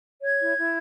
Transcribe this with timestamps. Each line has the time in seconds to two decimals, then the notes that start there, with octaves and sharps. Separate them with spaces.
0.23 C#5 G#6
0.41 E4
0.57 E4